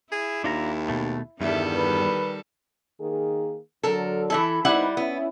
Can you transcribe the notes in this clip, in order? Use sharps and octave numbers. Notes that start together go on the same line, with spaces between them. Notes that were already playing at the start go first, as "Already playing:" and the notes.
E4 G#4
D#2 D4 F4 A#5
B2 A3
E2 G2 D#3 G3 A4 E5
B4
D#3 A#3 G#4
D3 F#3 A4 A#4
E3 E4 A4
G3 B3 C4 D#4 E4 F#5
B3 C#4 E4